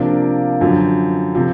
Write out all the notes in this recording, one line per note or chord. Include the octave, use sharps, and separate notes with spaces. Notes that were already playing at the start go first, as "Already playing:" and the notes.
Already playing: C3 F3 A#3 D4 F4
F#2 D3 F3
C3 F3